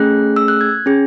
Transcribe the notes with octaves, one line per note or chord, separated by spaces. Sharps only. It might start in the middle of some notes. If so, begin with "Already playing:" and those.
Already playing: A3 C#4 G#4 F#6
E6
F#6
G#6
C#4 G#4